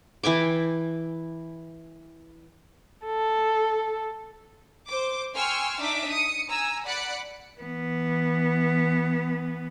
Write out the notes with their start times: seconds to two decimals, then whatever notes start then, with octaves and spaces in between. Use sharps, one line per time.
0.23 E3 G5 G#5 D6
3.05 A4
4.88 C5 D6
5.35 G5 G#5 C6 C#6 E6 F6
5.80 D4 D#4 E5 D6
6.10 D#6 C#7
6.50 G#5 A#5 E6
6.86 D5 F#5 B5 F#6 C#7
7.59 E3 B3